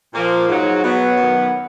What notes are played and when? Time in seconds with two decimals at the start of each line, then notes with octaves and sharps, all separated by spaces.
0.13 A#2 F3 A#3
0.47 G#2 F#3
0.82 B2 F#3 B3
1.17 F#2 D#3 F#3